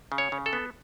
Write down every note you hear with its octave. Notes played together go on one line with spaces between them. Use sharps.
C#3
C#5
C#3
A4
B3